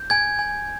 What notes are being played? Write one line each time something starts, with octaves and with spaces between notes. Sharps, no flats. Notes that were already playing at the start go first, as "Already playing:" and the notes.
Already playing: G6
G#5 G#6
G#5